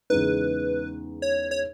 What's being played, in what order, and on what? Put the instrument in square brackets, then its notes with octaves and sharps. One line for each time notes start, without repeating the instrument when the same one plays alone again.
[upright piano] E2 C#3 G#3 D#4 [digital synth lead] B4
[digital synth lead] C#5
C#5